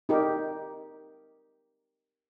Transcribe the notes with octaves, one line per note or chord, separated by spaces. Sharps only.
D#4 G4 A#4